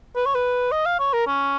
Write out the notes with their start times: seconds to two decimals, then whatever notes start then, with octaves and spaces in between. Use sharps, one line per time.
0.16 B4
0.26 C#5
0.35 B4
0.72 D#5
0.86 F5
0.99 C#5
1.13 A#4
1.27 C#4